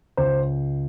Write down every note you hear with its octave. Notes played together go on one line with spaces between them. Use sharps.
C#2 C5